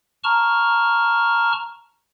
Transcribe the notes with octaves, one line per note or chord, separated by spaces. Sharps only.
A5 A#5 C#6 F6